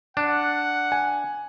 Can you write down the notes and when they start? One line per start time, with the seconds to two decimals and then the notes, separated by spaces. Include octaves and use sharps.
0.17 D4 F#5
0.92 G#5